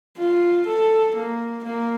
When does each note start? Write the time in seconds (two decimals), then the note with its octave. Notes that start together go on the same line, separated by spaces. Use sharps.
0.17 F4
0.66 A4
1.15 A#3
1.64 A#3